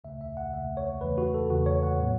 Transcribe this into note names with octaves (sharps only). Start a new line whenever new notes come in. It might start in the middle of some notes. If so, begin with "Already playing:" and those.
C#2 C#3 A3 E5
E5
F#5
C#2 C#3 A3 E5
C#5
E2 C#3 E3 A3 B4
F#4
A4
E2 C#3 E3 A3 F#4
C#5
F#5
A2 F#3 B3